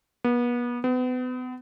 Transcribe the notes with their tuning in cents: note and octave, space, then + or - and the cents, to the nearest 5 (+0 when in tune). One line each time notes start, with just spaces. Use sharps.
B3 -35
B3 +35